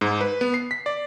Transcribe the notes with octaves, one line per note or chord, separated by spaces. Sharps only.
G#2
B4
B3
C7
B6
D5